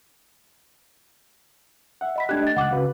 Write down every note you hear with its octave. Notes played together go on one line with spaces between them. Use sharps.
E5 F#5
D#5 B5 B6
A3 D4 G4 F#6 G#6
D#5 A6
C#2 F#5 D6 F#6
C#3 F#4 B4 F5